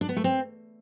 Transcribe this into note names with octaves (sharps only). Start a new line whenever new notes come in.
D4
B3
A3
C4